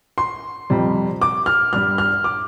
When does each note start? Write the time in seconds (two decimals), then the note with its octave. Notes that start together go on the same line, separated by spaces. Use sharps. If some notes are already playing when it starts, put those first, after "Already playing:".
0.18 C6
0.70 F2 C3 G3
1.22 D6
1.46 F6
1.73 G2 G3 F6
1.98 F6
2.24 D6